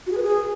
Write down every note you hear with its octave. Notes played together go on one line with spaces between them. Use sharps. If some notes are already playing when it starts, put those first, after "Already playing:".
F#4
G#4
B4
G#4